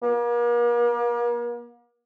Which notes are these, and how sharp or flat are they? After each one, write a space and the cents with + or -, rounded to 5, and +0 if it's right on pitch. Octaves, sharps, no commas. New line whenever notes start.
A#3 +40